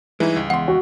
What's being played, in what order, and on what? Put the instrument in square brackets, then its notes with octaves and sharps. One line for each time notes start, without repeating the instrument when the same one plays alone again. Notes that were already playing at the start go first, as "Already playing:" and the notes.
[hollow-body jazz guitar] G2 G#3 [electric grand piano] E3 D#4 E4
[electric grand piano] C#2
[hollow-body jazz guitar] E2 C6 [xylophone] F#5
[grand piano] F#4